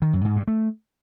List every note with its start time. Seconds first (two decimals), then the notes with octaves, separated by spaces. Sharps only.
0.02 D#3
0.13 F#2
0.25 G#2
0.36 G2
0.48 A3